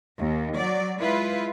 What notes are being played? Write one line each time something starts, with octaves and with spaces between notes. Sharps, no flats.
D#2
F#3 D5
G#3 E4 F4 B4